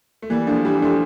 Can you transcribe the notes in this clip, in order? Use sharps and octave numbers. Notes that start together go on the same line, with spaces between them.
A3
E3 G3 A#3
F3 A3 D4
E3 G3 G4
F3 A3 D4